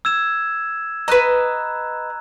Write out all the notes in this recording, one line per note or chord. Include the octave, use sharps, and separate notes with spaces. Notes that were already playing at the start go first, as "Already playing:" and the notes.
E6 G#6 E7
B4 D#5 A#5 F#6